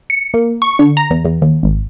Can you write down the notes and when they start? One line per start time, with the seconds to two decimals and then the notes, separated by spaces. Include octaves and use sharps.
0.10 C#7
0.34 A#3
0.62 C#6
0.79 D3
0.97 A#5
1.10 E2
1.25 E2
1.42 D#2
1.63 G#1